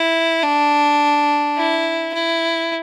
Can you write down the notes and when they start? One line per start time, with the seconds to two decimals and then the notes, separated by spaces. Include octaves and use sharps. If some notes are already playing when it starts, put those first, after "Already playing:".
Already playing: E4
0.44 D4
1.57 E4
2.14 E4